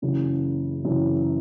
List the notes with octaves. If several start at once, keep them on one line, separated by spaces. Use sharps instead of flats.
F#1 F#2 C#3 E3
F#1 F#2 C#3 E3